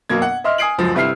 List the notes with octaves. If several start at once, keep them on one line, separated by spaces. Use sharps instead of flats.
F#2 B2 A#3 G#6
F#5
D#5 E5 C6 F6
G#5 D#6 G#6 C7 D7 F#7
C#2 F#2 F3
G1 C3 E4 E5 F6 C7